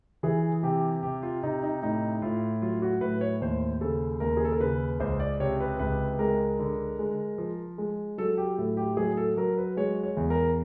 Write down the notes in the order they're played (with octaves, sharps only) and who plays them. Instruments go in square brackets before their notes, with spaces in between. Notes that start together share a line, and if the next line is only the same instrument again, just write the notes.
[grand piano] E3 G#4
C3 G4
C3 G4
F4
C3 D#4
D#4
A2 D#4
A2 F4
F#3 F4
F#4
A2 B4
C#5
D#2 C5
C#3 A4
D#2 A#4
G#4
A4
A#4
C#3 B4
C#2 C5
D5
C3 C#5
B4
C#2 B4
G#3 A#4
D3
G#3
F3
G#3
F#3 A4
G4
A2 A4
G4
F#3 G#4
A4
F#3 A#4
B4
G#3 C#5
C#5
E2
A#4